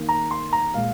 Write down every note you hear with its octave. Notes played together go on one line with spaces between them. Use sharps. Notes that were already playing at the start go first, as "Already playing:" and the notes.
Already playing: D#3 A#3
A#5
C6
A#5
A#2 G#3 F5